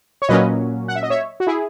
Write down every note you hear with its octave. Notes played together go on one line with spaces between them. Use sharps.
C#5
A#2 F#3 A#3 C#4 B4 D#5
F#5
E5
D#5
C#5 E5
F#4
E4 G#4